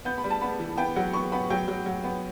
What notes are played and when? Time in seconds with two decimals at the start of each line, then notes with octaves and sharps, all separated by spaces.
0.05 B3 G6
0.18 B5
0.24 G3
0.30 A5
0.41 B3 B5
0.59 E3
0.77 B3 G5
0.96 F#3 F#5
1.13 B3 C#6
1.32 B3 B5
1.50 F#3 G5
1.68 F#3
1.86 F#3
2.04 B3